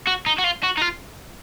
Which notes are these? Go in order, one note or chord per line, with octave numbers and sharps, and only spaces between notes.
F#4
D#4
F#4
F4
F#4
D#4
F4